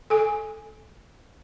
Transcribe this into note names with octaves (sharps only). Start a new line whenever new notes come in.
A4 G#5